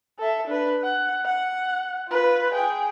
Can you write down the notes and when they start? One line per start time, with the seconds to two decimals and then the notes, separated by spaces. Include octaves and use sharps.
0.19 A4 E5
0.47 D4 B4
0.83 F#5
1.25 F#5
2.09 F4 B4
2.54 G#4 G5